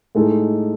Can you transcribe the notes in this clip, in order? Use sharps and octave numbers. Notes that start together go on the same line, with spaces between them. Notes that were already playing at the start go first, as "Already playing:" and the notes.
A2 G#3 D#4 A4